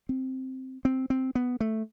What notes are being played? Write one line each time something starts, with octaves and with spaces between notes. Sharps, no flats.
C4
C4
C4
B3
A3